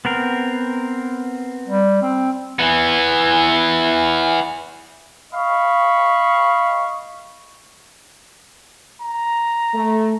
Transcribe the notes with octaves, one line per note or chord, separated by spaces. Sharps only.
B3 C4 A#4
G3
C4
E3 B3
D#5 F5 B5 C#6
A#5
A3